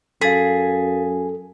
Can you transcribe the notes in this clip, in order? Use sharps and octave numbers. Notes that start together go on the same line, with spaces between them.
F#2 G#4 A4 F5 A6 B6